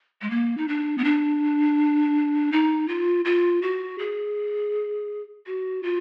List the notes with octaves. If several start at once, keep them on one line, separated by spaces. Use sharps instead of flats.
G#3
A#3
D#4
D4
B3
D4
D#4
F4
F4
F#4
G#4
F#4
F4